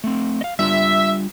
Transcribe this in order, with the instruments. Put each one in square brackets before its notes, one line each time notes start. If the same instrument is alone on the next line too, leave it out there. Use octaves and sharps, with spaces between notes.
[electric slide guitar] A3 C4
D#5 F5
[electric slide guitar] G3 D4 F4 [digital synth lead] E5